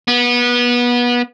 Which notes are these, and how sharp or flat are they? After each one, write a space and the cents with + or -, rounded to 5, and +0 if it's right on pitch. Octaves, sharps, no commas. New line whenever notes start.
B3 -25